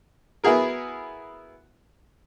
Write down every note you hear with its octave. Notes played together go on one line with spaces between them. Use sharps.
B3 E4 F#4 G#4 A#4